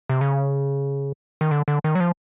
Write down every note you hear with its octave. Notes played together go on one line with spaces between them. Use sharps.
C3
C#3
D#3
D3
D3
D#3
F#3
F3